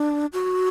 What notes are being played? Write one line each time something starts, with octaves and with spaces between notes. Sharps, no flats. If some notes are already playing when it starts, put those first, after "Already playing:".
Already playing: D4
F#4